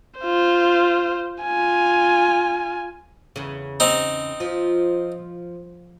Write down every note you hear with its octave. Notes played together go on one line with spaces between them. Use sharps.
F4 C5
F4 G#5
E2 C#3
C4 D#4
F3